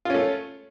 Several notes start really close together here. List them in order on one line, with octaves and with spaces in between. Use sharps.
F4 C#4 A3